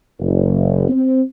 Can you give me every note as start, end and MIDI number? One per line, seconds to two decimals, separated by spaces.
0.19 0.85 30
0.89 1.20 60